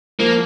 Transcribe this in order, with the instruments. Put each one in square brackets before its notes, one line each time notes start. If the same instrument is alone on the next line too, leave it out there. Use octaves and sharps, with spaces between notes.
[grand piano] F3 [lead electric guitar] A#3